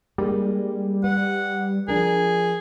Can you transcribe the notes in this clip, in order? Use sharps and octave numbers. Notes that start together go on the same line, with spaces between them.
G3 G#3 A#3 D4
B4 F#5
F3 D4 G#4 A#4